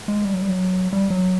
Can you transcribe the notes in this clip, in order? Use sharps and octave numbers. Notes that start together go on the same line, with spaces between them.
G#3
G3
F#3
G3
F#3
G3
F#3